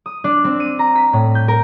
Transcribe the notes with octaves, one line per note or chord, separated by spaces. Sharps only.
D#6
D4
C4
D#7
A#5
B6
A2
G6
A#4